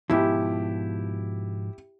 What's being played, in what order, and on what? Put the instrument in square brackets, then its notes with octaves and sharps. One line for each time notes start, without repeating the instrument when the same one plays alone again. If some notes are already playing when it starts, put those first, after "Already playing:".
[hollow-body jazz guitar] G#2 B2 F3 [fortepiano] E4 G4